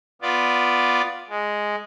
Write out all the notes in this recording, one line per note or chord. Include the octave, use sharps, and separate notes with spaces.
B3 F4 D5
G#3